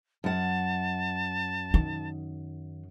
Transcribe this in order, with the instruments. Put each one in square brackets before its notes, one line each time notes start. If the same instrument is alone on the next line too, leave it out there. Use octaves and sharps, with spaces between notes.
[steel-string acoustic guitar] F#2 F#5 [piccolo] A5
[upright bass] D#3